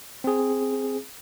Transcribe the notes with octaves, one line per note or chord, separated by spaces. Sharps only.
C4 G#4